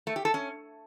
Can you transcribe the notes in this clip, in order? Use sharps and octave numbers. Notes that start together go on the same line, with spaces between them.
A3
G4
A4
C#4